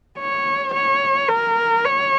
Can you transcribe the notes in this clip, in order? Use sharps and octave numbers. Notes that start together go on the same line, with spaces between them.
C#5
C#5
A#4
C#5